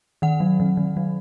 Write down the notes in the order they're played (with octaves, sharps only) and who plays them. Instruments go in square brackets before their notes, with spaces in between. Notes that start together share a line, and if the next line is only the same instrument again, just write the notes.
[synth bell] D#3 F#5
F#3
D#3
D#3
F#3